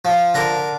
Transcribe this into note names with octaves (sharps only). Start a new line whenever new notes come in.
F3
D3 A#4